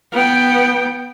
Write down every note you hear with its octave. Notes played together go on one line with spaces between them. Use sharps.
B3 G5